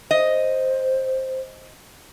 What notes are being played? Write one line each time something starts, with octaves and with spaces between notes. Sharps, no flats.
C5 D#5